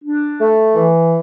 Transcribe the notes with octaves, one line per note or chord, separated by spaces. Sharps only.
D4
A3
E3